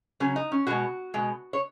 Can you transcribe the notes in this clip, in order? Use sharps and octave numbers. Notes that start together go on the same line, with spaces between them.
C#3 F#3 C#4
D#4
C#4
B2 G#3 F#4
B2 G#3
C#5